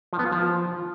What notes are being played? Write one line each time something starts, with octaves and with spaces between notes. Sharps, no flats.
F3
B3
F4
F3